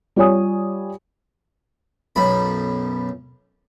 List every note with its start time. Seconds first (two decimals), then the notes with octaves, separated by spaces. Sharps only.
0.16 G3 F4 G4 C#5 G#5 D#6
2.16 B1 F#2 B5